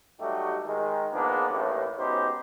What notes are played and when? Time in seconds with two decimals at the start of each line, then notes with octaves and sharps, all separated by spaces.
0.21 F#3 G3 A3 D#4 F#4 G4
0.67 D#3 G#3
1.13 A#1 G#2 A#3 B3 D4
1.50 A1 D#2 A2
1.98 G#2 B2 C#4 D#4 G4 C5